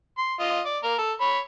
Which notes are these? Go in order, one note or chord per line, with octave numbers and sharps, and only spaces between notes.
C6
F4 D#5
D5
A#3 A#4
A4
C#5 B5